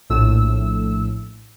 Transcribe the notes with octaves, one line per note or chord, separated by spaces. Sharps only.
A#1 A2 E6